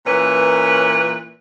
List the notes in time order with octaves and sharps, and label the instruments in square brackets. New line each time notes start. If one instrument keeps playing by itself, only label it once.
[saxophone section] A#2 E3 C#4 A#4 B4